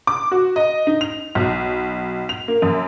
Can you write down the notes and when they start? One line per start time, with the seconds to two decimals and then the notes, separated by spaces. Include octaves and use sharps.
0.07 D6
0.31 F#4
0.56 D#5
0.87 D#4
1.01 F7
1.35 B1
2.29 F7
2.48 A#3
2.62 F#2